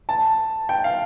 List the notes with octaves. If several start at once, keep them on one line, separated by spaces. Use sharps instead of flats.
A5
G5
F5